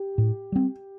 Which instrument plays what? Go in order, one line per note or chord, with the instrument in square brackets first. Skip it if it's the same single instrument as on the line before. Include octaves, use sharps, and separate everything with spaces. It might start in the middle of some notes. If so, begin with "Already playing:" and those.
Already playing: [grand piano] G4
[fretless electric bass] A2
G3 C4